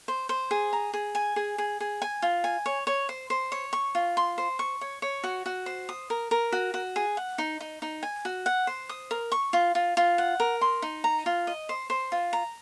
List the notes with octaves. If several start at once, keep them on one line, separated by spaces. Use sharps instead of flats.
C5
C5
G#4
A#5
G#4
G#5
G#4
G#4
G#4
G#5
F4
G#5
C#5
C#5
C5
C5
C#5
C#6
F4
C6
C5
C#6
C#5
C#5
F#4
F#4
C5
D#6
A#4
A#4
F#4
F#4
G#4
F#5
D#4
D#4
D#4
G#5
F#4
F#5
C5
D#6
A#4
C#6
F4
F4
F4
F#5
A#4
C6
D#4
A#5
F4
D#5
C5
C5
F4
A#5